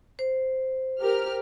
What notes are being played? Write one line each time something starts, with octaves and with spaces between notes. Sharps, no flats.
C5
G4 A#4 F6